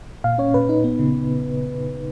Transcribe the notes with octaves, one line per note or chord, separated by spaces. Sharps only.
A#2 F5
C#4 C#5
A#2 B4
D#4
B3
C#3